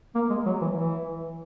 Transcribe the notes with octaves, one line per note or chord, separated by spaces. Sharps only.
A#3
G#3
F#3
E3
E3